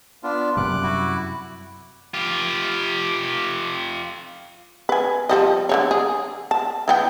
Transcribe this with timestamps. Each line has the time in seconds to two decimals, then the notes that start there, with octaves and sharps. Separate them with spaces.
0.23 B3 D4 F4
0.57 F#2 C3 G3 D6 F#6
0.83 E4 F#4
2.14 F4 G4
4.89 B4 G#5
5.29 F3 G3 D#5
5.69 D3 A3 C#5
5.91 G#4
6.51 A5
6.88 E3 B3 G5